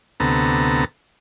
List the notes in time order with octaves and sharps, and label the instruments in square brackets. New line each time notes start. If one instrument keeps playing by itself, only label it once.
[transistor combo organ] D2 C3 B3 A4 A#5